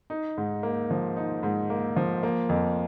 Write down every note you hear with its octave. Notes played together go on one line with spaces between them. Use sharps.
D#4
G#2
A#3
F3
D#4
G#2
A#3
F3
A#3
F2